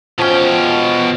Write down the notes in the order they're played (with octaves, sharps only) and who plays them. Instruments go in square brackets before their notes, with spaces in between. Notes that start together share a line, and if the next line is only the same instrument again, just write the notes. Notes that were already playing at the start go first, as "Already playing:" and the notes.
[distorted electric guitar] B2 G5 [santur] F3 C#4